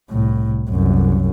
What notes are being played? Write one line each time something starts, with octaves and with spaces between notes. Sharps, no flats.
C2 A2
C2 F#2